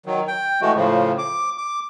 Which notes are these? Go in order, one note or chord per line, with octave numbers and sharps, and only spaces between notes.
D#3 F#3
G5
E3 G#3 A3 F#4
A2 C#3 F3
D6
D6